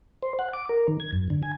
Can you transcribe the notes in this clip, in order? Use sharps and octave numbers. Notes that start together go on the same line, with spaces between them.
C5
F#5
D6
A#4
D#3
G#6
F#2
D3
G#5